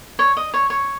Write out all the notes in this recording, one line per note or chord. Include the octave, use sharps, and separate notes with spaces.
C#5
D#5
C#5
C#5